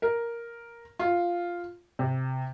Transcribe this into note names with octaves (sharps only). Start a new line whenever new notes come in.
A#4
F4
C3